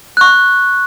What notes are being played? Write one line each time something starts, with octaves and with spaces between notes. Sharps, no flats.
C#6 F#6